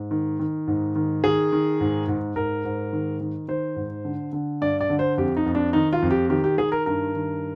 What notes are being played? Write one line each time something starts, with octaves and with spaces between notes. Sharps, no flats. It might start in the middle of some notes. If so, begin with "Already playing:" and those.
Already playing: G#2
D#3
D#3
G#2
D#3
D#3 G#4
D#3
G#2
G#2
G#2 A#4
G#2
D#3
D#3
D#3 C5
G#2
D3
D3
G2 D5
D5
D3
C5
F2 G4
D#4
F2
D4
D#3 D#4
F4
F2
G4
D#3 G4
G4
D#3 G#4
A#4
G2 A#4
D#3